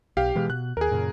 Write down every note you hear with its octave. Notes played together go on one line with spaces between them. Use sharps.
B1 G4 F5
B2 E3 G#3
B2 F#6
D#2 G#4 A#4
F#2 A#2 C#3